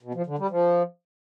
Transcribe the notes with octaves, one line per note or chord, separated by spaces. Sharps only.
B2
F3
D3
G3
F3